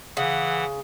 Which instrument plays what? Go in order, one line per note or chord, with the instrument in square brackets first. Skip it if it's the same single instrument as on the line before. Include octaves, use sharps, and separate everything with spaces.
[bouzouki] C#3 [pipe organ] E3 [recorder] F#5